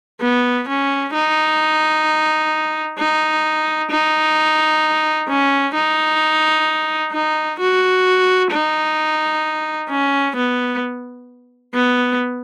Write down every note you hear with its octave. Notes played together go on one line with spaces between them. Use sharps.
B3
C#4
D#4
D#4
D#4
C#4
D#4
D#4
F#4
D#4
C#4
B3
B3